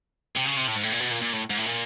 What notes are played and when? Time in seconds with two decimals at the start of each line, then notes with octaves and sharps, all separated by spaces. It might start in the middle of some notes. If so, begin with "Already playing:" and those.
0.36 C3
0.45 C#3
0.56 C3
0.67 A2
0.75 G#2
0.83 A2
0.92 A#2
1.00 B2
1.11 A#2
1.22 A#2
1.33 A2
1.50 G#2
1.57 A2
1.66 A#2